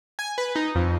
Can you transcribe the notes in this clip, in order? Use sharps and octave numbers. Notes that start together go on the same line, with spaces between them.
G#5
B4
D#4
F2